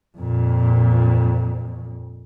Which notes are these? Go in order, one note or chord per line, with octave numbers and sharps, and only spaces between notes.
F2 A#2